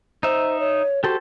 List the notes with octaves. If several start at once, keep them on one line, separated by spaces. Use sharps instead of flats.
D#4 C5 E5
C#5
F#4 G4 A4 C5